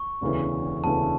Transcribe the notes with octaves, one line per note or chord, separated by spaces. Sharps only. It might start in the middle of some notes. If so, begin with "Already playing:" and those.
Already playing: C#6
E1 D2 C#3 E3
E1 D2 C#3 E3 A5